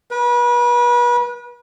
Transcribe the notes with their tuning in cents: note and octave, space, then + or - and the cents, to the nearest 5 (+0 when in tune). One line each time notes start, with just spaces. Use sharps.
B4 -35